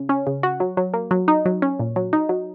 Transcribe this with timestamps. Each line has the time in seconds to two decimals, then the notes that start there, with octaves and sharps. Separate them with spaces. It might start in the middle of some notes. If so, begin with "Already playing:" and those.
Already playing: C#3
0.09 C#4
0.27 C#3
0.43 F#4
0.60 F#3
0.77 F#3
0.94 A#3
1.11 F#3
1.28 D#4
1.46 F#3
1.62 C#4
1.79 A#2
1.96 F#3
2.13 D#4
2.29 F#3